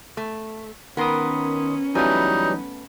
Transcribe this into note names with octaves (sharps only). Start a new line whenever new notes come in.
A3
D#3 B3 C#4 A#4 C6 D#6
E3 F#3 G3 A3 B3 D#4 G#5